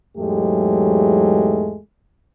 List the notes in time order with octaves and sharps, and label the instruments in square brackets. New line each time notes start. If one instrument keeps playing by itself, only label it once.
[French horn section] E2 G#2 F#3 G#3 A3 G4